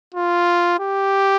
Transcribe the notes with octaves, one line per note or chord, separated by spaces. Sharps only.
F4
G4